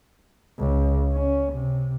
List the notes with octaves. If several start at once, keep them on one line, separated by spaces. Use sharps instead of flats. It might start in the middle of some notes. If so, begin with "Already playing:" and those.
C#2
C#4
C3